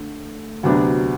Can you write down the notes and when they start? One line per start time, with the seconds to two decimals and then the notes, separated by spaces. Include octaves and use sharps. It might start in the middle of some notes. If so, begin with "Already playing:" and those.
Already playing: D3 A3
0.63 D2 C3 F#3 B3 D4